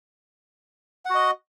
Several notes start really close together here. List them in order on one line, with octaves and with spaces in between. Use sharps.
F#5 F#4 D#5